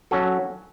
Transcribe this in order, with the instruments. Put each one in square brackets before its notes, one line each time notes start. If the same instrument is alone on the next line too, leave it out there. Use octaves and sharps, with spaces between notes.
[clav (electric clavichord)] F#3 C#4 F#4 A4